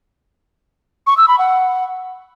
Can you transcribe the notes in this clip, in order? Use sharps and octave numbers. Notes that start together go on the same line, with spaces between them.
C#6
E6
B5
F#5